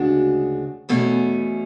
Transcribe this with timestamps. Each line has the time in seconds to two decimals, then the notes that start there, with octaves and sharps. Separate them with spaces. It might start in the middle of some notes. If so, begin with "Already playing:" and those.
Already playing: D2 C#3 G#3 D4 F#4
0.89 E2 B2 A3 C#4